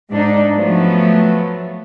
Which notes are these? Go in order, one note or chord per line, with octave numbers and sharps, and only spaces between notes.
G#2 D4 D#4
F3 F#3 A3 B3